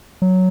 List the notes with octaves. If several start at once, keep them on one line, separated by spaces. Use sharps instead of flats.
F#3